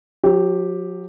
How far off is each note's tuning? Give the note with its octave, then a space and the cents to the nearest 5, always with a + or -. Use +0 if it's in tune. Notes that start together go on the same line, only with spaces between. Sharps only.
F#3 -45 G4 +0